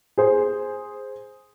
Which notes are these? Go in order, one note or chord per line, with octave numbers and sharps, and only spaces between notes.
G#4 C5